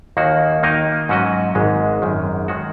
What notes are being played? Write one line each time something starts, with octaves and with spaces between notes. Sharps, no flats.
D#2 D#3 A#3 F#4
D#3 A#3 D#4 A#4 D#5
G#2 F#3 C#4 F#4 D#5
G#1 G#2 G#3
G#1 F#2 D#3
D#3 G#3 F#4